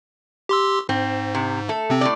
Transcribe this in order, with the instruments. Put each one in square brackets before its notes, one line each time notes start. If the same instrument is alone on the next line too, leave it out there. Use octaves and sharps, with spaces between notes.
[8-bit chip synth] G4 C6 E6
[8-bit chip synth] G#2 [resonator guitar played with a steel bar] C4
[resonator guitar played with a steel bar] C3
A3 A4
[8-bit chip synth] C3 C4
[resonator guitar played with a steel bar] A2 D5